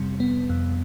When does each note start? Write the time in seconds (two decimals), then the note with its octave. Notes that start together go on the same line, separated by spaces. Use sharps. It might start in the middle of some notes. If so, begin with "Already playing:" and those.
Already playing: F2 C3 G3 C4
0.20 B3
0.49 F2